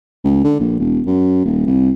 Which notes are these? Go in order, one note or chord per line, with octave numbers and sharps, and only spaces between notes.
C#2
D3
A#1
E1
F#2
D#1
C2